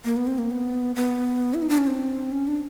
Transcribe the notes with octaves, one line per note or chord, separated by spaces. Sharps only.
A#3
B3
C4
A#3
B3
B3
E4
D#4
D4
C#4
C4
C#4
D4